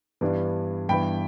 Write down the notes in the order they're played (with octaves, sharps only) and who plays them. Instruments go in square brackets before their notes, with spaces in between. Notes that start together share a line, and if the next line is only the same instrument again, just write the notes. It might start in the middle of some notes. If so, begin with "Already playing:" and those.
[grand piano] G2 E3 G3 B3 D4
G2 E3 B3 G5 B5